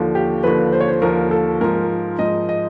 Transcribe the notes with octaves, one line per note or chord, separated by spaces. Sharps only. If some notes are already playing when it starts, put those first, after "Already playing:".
Already playing: D#2 D3 F3
G4
D#2 D3 F3 B4
C5
C#5
C5
D#2 D3 F3 A#4
A4
G#2 F3 A#4
G#2 F3 D#5
D#5